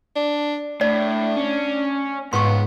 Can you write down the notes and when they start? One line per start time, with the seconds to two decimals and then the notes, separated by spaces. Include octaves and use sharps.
0.16 D4
0.81 A2 D4 D5
1.37 C#4
2.33 C#2 G#2 B3 C6 C#6